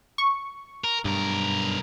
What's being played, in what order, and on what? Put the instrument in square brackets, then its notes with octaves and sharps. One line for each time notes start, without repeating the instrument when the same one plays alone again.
[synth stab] C#6
[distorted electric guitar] A#4
[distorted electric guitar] B1 A#4 [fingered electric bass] G2